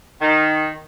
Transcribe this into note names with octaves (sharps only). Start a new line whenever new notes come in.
D#3